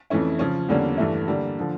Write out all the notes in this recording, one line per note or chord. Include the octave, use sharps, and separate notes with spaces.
F2 E3 A3 C#4 E4
C#3 F3 C#4
E2 D3 G3 A#3 C#4
G2 E3 A3 E4
D3 G3 A#3
D3 F3